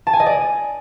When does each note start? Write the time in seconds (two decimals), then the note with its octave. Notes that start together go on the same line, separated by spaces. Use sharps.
0.07 A5
0.13 G#5
0.20 D#5
0.26 D5